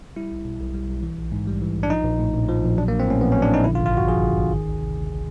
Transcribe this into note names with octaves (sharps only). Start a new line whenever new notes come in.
G3 E4
B1
B2
B1
G3
B1
E3
A#1
G#2
G3
E3
A#1
D4
F3 D#4
A#1
A2
A#1
F3
A#1
F#3 D4
A#3
A#1
C4
A2 C#4
A#1 B3
C#4
F#3
D4
A#1 D#4
D3 E4
F4
G#1
F4
G2 F#4
F3 G#4
D3
G#1
D#3
D2
C3
D2
D#3